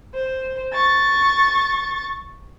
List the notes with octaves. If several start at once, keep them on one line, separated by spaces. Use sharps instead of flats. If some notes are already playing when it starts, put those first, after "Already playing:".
C5
C#6 A6